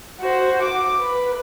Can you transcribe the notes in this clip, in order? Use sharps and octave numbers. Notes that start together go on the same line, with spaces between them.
F#4 C5
D6
B4